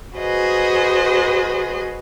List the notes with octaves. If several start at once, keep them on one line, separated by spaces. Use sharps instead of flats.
F#4 G#4 B4 C5 D#5